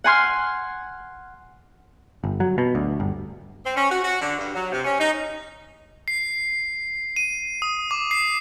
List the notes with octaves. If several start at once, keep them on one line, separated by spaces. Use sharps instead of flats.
F#5 G#5 C6 F6
G1
F#3
B2
D2
G1
C4
C#4
F#4
F#4
D3
G2
F#3
C3
C#4
D#4
C7
D#7
D#6
D6
C7